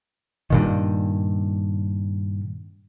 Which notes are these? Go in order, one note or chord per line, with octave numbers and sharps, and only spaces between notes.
G2 A#2 D#3